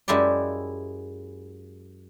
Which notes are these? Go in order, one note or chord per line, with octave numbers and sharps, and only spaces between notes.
F#2 G#3 E4 G4 D5